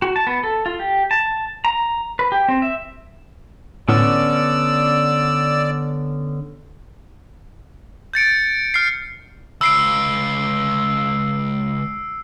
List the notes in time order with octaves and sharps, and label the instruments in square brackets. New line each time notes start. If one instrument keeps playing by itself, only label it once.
[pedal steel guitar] F#4
A5
B3
A4
F4
G4
A5
A#5
B4
G4
C4
E5
[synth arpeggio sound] A2 [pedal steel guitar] D3 B3 C#4 [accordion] D5 [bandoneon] E6
[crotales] G6 A6 C#7 D7
F6 C7
[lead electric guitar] C#2 [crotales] E6 C7 D7